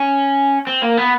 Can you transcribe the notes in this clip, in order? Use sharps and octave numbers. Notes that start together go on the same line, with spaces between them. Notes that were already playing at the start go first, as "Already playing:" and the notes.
Already playing: C#4
C4
A#3
B3